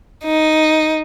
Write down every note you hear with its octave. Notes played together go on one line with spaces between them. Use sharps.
D#4